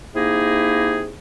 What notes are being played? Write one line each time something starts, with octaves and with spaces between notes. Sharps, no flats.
C3 A#3 D#4 E4 G#4